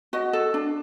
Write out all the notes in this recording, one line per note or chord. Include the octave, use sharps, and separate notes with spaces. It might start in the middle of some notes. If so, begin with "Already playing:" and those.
F#4 D#5
A4
D4